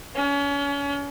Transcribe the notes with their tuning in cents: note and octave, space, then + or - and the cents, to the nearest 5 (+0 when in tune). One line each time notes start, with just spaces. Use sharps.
C#4 +35